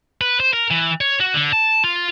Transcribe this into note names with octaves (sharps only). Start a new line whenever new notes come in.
B4
C5
A#4
E3
C#5
F#4
D3
A5
F4